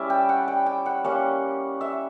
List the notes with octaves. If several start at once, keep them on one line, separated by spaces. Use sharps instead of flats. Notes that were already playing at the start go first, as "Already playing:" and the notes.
Already playing: G3 C#4 E4 D5 E5
G5
F#5
G5
G5
F#5
G3 A#3 C#4 F#5
E5